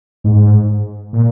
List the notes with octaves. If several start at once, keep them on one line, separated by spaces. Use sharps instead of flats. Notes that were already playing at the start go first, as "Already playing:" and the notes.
G#2
A#2